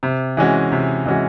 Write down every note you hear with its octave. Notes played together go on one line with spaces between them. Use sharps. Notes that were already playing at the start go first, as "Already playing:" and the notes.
C3
E3 G#3 C#4 F#4
C3
E3 G#3 C#4 F#4